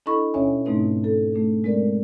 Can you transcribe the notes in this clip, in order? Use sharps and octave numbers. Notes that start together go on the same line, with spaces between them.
D4 E4 A4 D#5 B5 C#6
D#2 B2 C#4 C#5 E5 G#5
G#2 B2 A3 C4 D#4 B4
A4
A3 D4 G#4
G#3 C4 A#4 D5